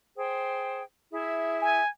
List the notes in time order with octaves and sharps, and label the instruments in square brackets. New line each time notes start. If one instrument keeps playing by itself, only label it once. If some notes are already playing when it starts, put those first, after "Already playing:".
[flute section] G#4 C5 G5
E4 G#4 E5
[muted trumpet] G#5